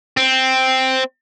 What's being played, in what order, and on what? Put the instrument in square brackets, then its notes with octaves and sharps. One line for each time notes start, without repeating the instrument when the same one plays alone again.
[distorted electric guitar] C4